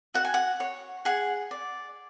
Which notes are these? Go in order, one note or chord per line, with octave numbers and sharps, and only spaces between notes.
F#4 F#5
G#5
F#5
C#5
G#4 F#5
D5